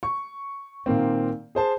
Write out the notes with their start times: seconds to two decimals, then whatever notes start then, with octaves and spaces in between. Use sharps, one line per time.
0.03 C#6
0.86 A#2 D#3 A#3 C4
1.55 G#4 C5 A5